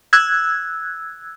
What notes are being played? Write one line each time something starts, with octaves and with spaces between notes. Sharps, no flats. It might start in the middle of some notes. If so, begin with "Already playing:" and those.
E6 F#6 G#6